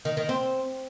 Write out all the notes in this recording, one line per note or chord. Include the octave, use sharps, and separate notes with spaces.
D#3
D#3
C4